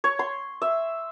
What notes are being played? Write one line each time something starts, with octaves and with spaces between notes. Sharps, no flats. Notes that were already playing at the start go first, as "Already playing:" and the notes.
C#5
C6
E5